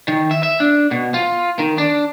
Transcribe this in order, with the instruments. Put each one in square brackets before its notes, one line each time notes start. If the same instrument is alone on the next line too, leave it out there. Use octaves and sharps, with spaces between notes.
[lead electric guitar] D#3
E5
E5
D4
B2
F4
D#3
D4